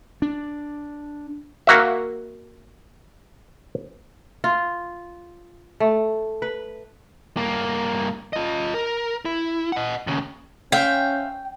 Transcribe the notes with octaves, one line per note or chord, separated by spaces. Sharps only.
D4
A#3 F#4 E5
F4
A3
B4
G2 A#3
F4 D#5
A#4
E4
D#5 F#5
D#2 C#3
C#4 C5 E5 F5 G5